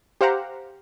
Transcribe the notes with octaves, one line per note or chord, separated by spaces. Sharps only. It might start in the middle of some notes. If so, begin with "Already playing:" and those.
G4 C5 F5 F#5 A#5